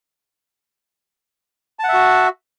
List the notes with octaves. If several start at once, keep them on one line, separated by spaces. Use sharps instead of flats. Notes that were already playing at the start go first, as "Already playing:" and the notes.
F#4 E5 F#5 A5